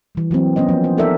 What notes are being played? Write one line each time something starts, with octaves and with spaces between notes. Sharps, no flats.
E3 G3
E3 F#3 A#3 C4
B3 C#4 C5 D#5
F3 A#3
C5
D#4 A4 A#4 D5 E5